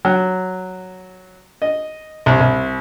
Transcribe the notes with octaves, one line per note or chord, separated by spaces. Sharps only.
F#3
D#5
C2
C2